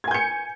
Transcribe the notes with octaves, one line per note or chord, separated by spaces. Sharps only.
G#5 G6 G#6 C#7